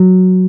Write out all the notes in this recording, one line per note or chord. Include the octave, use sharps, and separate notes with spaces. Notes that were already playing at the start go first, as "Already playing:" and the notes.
Already playing: F#3